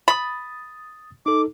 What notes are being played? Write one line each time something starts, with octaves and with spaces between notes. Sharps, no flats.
B5 D#6 A6
D#4 A4 D6